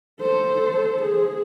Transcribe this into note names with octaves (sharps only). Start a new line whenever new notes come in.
A4 C5
G#4